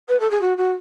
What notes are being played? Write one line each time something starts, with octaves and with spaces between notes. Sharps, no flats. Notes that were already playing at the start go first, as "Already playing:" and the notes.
B4
A4
G#4
F#4
F#4